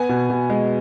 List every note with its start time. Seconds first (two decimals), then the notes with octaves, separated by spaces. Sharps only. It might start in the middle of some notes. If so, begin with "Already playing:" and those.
Already playing: B3 G#5
0.09 B2
0.30 B2
0.50 G#3